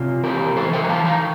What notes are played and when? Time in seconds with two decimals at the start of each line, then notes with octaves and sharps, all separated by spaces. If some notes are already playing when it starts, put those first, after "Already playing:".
Already playing: C3 F4
0.23 E3 G4 A#4
0.56 E3 A4 C5
0.73 E5 G5
0.84 A#5
0.89 E3 F5 A5
1.05 G5 A#5